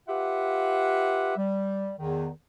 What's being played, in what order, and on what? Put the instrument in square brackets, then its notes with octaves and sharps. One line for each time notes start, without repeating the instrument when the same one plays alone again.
[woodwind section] F4 G4 B4 E5 F#5
G3
E2 D#3